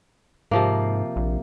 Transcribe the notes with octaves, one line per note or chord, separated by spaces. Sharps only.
G#2 C3 F3 A#3
A#1